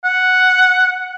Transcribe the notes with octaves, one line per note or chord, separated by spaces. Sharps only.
F#5